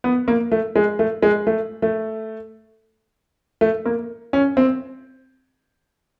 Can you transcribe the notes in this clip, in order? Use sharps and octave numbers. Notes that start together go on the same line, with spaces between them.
B3
A#3
A3
G#3
A3
G#3
A3
A3
A3
A#3
C#4
C4